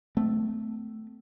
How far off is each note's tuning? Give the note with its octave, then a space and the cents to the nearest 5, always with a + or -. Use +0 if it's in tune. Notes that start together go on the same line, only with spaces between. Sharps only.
A3 +0 C4 -40